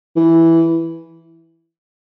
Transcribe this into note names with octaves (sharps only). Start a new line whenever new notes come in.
E3